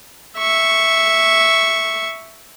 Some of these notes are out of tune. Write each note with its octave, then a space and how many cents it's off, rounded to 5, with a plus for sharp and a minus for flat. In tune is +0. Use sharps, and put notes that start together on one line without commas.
E5 +0 C#6 +0